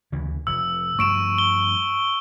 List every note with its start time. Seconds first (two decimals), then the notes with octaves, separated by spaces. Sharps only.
0.12 D2 C#3 E3
0.47 F1 E6
0.99 G2 F3 A3 C#6 D7 E7
1.38 G7